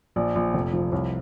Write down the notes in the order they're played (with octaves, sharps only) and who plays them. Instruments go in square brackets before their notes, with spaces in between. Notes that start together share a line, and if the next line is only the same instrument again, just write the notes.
[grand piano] A#1 D5
A#1
F1
F3
C2 C#5